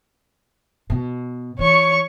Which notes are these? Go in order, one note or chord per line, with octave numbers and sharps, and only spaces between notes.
B2
E3 C#5 C#6